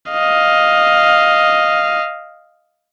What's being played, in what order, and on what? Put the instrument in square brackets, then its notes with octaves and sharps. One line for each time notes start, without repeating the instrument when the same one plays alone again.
[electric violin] D#5 F5